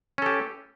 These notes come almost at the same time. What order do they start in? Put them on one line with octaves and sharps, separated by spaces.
C#4 A4 G4